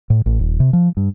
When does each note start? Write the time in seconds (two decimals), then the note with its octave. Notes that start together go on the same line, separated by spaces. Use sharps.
0.10 A2
0.26 A1
0.39 D#1
0.60 C3
0.73 F3
0.97 G2